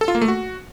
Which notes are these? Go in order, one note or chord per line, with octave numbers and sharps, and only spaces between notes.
A4
F4
A#3
A3
F#4